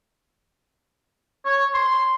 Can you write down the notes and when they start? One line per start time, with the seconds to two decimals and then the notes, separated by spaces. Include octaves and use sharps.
1.45 C#5
1.74 C6